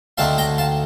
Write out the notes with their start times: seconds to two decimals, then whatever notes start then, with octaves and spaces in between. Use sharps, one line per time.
0.18 D2 D3 A3 C4 D#4 F5 A5
0.38 G5 A#5
0.58 F5 A5